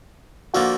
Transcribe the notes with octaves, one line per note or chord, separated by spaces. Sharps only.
D3 F3 A#3 F#4